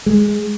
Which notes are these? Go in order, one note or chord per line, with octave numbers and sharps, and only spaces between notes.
G#3